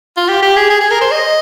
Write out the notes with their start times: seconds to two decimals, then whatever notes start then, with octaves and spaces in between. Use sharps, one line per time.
0.17 F4
0.29 G4
0.42 G4
0.56 G#4
0.70 G#4
0.81 G#4
0.91 A#4
1.01 C5
1.11 D#5